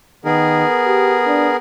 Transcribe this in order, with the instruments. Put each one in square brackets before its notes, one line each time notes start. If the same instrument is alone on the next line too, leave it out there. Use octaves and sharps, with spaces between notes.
[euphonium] D#3 [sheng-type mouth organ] B3 G#4 A#4
[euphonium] G4
D4